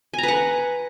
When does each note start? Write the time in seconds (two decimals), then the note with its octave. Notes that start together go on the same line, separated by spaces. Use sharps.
0.13 G#5
0.18 A#5
0.23 B4
0.28 F#5